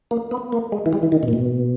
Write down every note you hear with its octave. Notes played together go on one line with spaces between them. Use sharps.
A#3
B3
A#3
G#3
E3
G3
E3
D#3
B2
A#2
B2